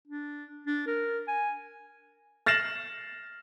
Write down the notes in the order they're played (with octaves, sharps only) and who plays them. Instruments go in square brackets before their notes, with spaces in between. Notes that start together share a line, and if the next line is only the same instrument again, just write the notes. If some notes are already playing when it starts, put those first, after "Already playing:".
[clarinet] D4
D4
A#4
G#5
[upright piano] F6 A6 A#6 C7 E7 F#7